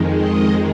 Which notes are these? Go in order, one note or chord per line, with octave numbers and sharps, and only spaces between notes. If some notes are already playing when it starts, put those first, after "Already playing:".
Already playing: F2 D#3 G#3
D#5